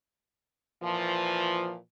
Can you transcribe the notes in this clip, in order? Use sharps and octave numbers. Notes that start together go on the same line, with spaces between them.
A#2 E3 F3